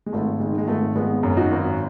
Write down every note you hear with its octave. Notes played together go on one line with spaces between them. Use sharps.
G#3
G#1 A3
D#3 G#3
G#3
G#1 A3
G#1 G#3 B3
F#2
D#4 F#4
G#1